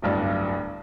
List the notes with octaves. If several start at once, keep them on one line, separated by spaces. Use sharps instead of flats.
D1 B1 G2 D4